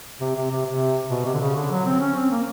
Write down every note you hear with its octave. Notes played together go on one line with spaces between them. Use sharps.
C3
C3
C3
C3
B2
C3
D3
C#3
D3
F#3
C4
C#4
C4
A#3